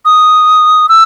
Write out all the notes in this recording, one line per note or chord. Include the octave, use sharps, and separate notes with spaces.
D#6
E6